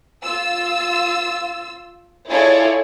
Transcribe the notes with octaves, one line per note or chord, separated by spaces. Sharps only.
F4 E6
E4 F4 G#4 A4 C#5 D5